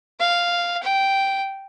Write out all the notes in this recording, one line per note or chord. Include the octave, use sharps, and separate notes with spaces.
F5
G5